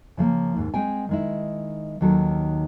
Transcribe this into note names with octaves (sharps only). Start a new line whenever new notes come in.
C#3 F3 A3 A#3
D#2 G#2
G#3 C4 G5 G#5
D#3 G#3 E4
D#2 D#3 F#3 A4